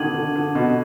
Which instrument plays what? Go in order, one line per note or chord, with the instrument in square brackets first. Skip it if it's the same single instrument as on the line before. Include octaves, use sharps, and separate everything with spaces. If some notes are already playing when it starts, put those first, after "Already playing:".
Already playing: [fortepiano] B2 D3 D#3 [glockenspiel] D6 G#6 D#7 F#7
[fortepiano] D3
D3
B2